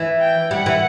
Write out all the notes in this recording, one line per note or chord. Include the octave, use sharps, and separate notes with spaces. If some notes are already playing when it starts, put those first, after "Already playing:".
Already playing: E3
G5
G3 F#5
E3